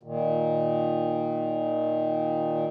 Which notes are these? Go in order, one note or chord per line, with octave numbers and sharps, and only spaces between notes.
A#2 D#3